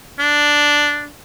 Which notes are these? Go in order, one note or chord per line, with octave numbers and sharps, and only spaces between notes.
D4